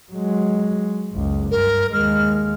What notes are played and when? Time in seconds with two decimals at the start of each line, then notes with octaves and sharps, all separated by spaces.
0.12 F#3 G#3
1.13 F#1 C#2
1.51 G2 A#4
1.93 D#2 G#3 F6